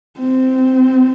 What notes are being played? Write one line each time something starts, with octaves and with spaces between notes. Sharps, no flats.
C4